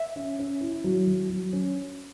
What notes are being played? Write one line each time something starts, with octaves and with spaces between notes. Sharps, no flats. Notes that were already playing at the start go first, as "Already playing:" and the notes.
Already playing: E5
C#4
C#4
E4
F#3
F#3
F#3
C#4